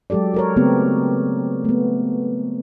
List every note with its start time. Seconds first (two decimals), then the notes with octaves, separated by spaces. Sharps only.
0.10 F#3 G#3 G4 A4 D5
0.34 A4 A#4 C#5
0.56 C#3 A3 B3 C4 G4
1.64 A3 B3